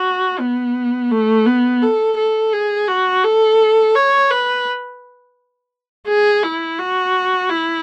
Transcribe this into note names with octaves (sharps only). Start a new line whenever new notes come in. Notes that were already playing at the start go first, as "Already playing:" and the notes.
Already playing: F#4
B3
A3
B3
A4
A4
G#4
F#4
A4
C#5
B4
G#4
E4
F#4
E4